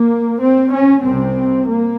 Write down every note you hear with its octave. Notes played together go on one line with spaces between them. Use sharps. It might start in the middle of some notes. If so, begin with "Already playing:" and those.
Already playing: A#3
C4
C#4
C2 C3 C4
A#3